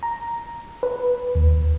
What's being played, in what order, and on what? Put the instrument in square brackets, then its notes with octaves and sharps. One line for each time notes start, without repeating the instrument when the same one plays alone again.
[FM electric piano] A#5
B4
D#2